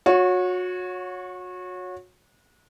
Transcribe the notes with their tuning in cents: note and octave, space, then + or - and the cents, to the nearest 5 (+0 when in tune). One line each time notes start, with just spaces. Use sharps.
F#4 -30 C#5 +0